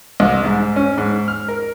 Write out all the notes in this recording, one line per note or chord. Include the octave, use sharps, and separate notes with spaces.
C2
G#2
C#4
G#2
F6
A#4